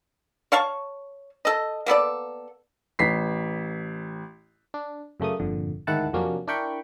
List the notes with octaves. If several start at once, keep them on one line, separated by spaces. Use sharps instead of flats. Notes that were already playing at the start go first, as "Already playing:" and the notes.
C#5 F5 A5 C#6
A4 D#5
A#3 B3 A4 D5
A1 B6 C7
D4
F#2 C#3 A3 A#3 D#6
G1 F2 A#2 D3
D2 G#2 D#3 E4 F#5 A5
F2 C3 F#3 A#3 C#4 D4
D4 E4 A#4 G5 B5 C#6